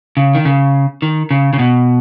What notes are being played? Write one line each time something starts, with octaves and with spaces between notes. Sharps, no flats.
C#3
D#3
C#3
D#3
C#3
C#3
B2